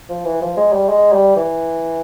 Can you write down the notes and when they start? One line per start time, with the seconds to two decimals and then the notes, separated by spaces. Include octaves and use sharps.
0.09 F3
0.25 E3
0.41 F3
0.57 G#3
0.73 G3
0.89 G#3
1.12 G3
1.36 E3